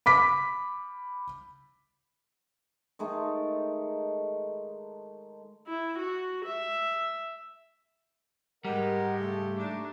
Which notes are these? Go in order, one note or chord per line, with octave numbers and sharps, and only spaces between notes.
B5 D6 B6
D#3 G#3 A3 D#4
E4
F#4
E5
G#2 G3 G#3 G4 A#4 D#5 F#5
C#3 A3 A4
D4 D#4 D6